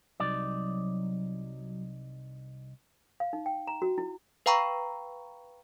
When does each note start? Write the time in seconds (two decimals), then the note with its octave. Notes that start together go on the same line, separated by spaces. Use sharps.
0.20 C2 F#3 D#4 D5
3.20 F5
3.33 D#4
3.46 G5
3.67 A#5
3.82 F#4
3.98 E4
4.46 B4 F5 G5 A#5 B5 C#6